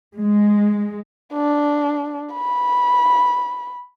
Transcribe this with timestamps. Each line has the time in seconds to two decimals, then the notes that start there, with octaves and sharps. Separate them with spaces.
0.19 G#3
1.33 D4
2.34 B5